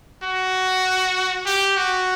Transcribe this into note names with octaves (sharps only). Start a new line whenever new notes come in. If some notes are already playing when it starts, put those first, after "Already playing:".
F#4
G4
F#4